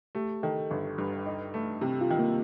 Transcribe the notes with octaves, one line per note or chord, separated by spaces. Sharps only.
A3 G4
D#3 A4
G1
G2
D#4
A3
C3 G4
F4
D#3
A#3